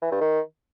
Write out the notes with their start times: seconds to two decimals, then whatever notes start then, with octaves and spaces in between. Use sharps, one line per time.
0.02 E3
0.12 G2
0.21 D#3